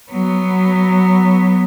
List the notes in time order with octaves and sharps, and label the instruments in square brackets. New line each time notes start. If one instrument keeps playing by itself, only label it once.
[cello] F#3 B3